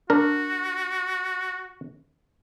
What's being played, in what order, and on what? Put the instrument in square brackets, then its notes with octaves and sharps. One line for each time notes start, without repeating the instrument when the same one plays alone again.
[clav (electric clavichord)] D4 A#4 [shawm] F#4